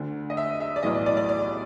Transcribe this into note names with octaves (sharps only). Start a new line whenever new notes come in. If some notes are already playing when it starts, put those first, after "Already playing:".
Already playing: D2 D3
D#5
E5
E5
D5
B1 A2 E3 D#5
D5
D5
D5
D5